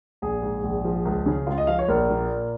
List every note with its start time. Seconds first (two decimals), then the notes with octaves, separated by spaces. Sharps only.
0.22 A#1 G#4
0.42 G#2
0.63 A#1
0.84 F3
1.05 C#2
1.26 C#3
1.47 C#2 F4
1.58 D#5
1.67 F3 F5
1.79 C#5
1.88 A#1 A#4
2.09 A#2